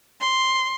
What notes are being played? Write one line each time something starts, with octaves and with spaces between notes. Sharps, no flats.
C6